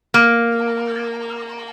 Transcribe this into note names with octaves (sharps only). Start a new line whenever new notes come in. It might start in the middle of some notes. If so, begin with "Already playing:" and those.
A#3